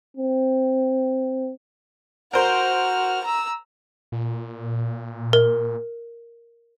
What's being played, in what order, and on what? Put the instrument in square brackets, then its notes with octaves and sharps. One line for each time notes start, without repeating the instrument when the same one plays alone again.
[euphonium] C4
[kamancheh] F#4 F6 [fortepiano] A#4 C5
[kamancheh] A#5 E6
[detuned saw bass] A#2
[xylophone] A#4